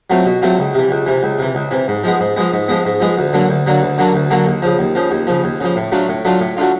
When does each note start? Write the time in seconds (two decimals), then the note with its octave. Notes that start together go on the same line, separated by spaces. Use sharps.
0.10 F#3 A3 C4 F4
0.26 B2
0.42 F#3 A3 C4 F4
0.59 C#2
0.74 C3 E3
0.91 C#2
1.06 C3 E3
1.23 C#2
1.39 C3 E3
1.55 C#2
1.71 C3 E3
1.88 G#2
2.04 F3 G#3 B3
2.20 G#2
2.36 F3 G#3 B3
2.53 G#2
2.68 F3 G#3 B3
2.85 G#2
3.00 F3 G#3 B3
3.17 D2
3.33 D3 F#3 A#3 D4
3.49 D2
3.66 D3 F#3 A#3 D4
3.82 D2
3.98 D3 F#3 A#3 D4
4.14 D2
4.30 D3 F#3 A#3 D4
4.46 D#2
4.62 C#3 F3
4.79 D#2
4.95 C#3 F3
5.11 D#2
5.27 C#3 F3
5.44 D#2
5.61 C#3 F3
5.76 A2
5.92 F#3 A3 D4 F4
6.08 A2
6.25 F#3 A3 D4 F4
6.40 A2
6.57 F#3 A3 D4 F4